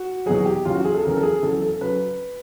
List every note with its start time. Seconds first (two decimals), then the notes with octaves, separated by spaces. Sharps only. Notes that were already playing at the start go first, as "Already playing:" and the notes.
Already playing: F#4
0.26 E2 B2 F#3 G#4
0.45 G4
0.65 E2 C#3 F#3 F4
0.75 F#4
0.85 G#4
0.95 A4
1.03 E2 C#3 F#3 A#4
1.17 A4
1.23 G#4
1.42 E2 C#3 F#3 A4
1.61 A4
1.81 C#3 F#3 B4